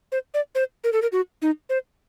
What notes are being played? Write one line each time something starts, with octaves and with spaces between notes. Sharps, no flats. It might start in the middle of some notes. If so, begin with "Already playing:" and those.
C5
D5
C5
A#4
A4
A#4
F#4
D#4
C5